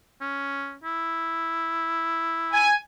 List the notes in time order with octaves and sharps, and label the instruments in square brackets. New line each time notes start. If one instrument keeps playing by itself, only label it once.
[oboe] C#4
E4
[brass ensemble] G#5